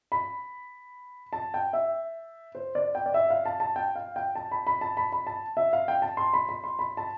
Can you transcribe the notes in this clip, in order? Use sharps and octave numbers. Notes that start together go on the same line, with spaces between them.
B5
A5
G5
E5
C5
D5
G5
D5
E5
F5
A5
A5
G5
F5
G5
A5
B5
B5
A5
B5
B5
A5
E5
F5
G5
A5
C6
B5
B5
C6
B5
A5